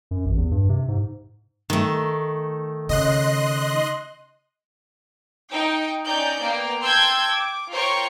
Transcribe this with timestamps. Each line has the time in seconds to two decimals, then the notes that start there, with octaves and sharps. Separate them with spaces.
0.11 F#2
0.25 A1
0.37 E2
0.51 G2
0.69 C3
0.88 G#2
1.70 D#3 A3
2.89 C#3 D#5 C6 F#6
5.52 D#4 G5
6.06 C#4 D#4 D5 G5 G6
6.41 A#3 B3 G5
6.83 G5 A5 C6 E6 G6 G#6
7.31 D6
7.72 F4 A#4 C5 C#5 G5 C#6